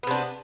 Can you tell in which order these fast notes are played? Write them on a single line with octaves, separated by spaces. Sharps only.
B3 C3 D4